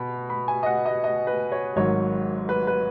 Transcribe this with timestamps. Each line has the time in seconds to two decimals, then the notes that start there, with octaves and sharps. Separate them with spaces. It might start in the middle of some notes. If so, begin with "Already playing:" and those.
Already playing: B2 B5
0.30 B5
0.48 G#5
0.63 D#5
0.66 F#5
0.86 D#5
1.04 D#5
1.27 B4
1.52 C#5
1.76 G#1 G#2 D#3 F#3 C#5
2.49 B4
2.67 B4